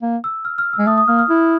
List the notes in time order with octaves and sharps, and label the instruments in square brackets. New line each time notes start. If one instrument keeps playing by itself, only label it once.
[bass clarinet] A#3
[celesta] E6
F6
F6
E6
[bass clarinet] G#3
[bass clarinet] A3 [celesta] D#6
[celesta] D#6
[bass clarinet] A#3 [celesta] F6
[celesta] F6
[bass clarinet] E4